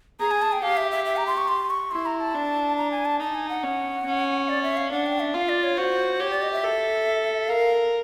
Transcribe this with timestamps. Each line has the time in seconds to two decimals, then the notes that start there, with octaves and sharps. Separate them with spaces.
0.20 G#4 A#5
0.31 G#5
0.42 A5
0.52 G5
0.62 G4 F5
0.77 E5
0.91 E5
1.05 E5
1.17 A#5
1.27 C6
1.37 C#6
1.48 C6
1.70 C#6
1.91 E4 C6
2.06 A#5
2.20 A5
2.34 D4
2.77 A#5
2.91 G#5
3.05 A5
3.20 D#4 A5
3.35 G#5
3.49 F#5
3.63 C#4
4.05 C#4
4.49 D5
4.63 E5
4.77 F5
4.91 D4 F#5
5.06 G5
5.20 E5
5.34 F4 F5
5.49 D5
5.63 C#5
5.77 F#4 C5
6.20 G4 C#5
6.31 D5
6.42 D#5
6.52 E5
6.64 A4
7.48 A#4 F5